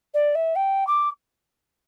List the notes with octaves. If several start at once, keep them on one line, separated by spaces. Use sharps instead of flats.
D5
E5
G5
D6